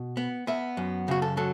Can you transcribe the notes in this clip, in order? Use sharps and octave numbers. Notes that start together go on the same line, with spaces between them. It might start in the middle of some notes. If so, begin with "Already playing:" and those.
Already playing: B2
B3
B3 E5
F#2
C#3 F#4
A4
F#3 A4